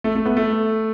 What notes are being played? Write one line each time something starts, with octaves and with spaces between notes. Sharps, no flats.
A3
A3
B3
A3